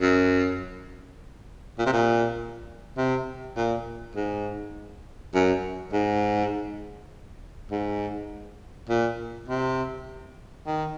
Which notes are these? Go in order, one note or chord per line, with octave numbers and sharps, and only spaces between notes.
F#2
A#2
C3
A#2
C3
A#2
G#2
F#2
G#2
G#2
A#2
C3
D#3